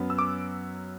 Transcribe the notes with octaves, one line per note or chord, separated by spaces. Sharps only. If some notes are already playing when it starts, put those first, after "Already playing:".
Already playing: F#2 F#3 B3
E6
D6